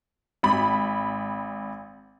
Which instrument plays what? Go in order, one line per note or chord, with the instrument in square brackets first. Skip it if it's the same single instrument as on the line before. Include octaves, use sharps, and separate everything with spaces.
[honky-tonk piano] G#1 B5